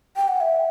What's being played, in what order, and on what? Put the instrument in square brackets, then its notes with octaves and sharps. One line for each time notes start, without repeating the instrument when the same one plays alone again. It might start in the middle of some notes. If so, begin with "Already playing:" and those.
[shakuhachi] G5
F#5
E5